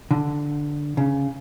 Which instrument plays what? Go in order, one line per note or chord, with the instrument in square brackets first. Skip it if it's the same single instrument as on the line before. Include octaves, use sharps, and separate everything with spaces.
[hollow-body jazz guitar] D3
C#3